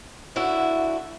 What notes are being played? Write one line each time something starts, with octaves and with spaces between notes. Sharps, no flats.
D3 E4 F#4 E5